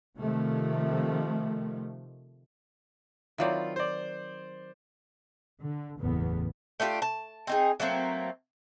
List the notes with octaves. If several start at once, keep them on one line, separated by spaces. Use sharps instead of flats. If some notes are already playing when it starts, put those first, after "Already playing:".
C3 D#3 F3 A3
D#3 F#3 C4 E4 F4 D5
C5 D5
D3
F#1 E2 A2 B3
A3 D4 F4 G4
A5
C4 D#4 G#4
F#3 A3 A#3 C4